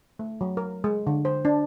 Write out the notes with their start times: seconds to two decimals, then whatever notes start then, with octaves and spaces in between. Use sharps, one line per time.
0.19 A3
0.41 F#3
0.57 A#4
0.84 G#3
1.07 D3
1.25 C5
1.45 D4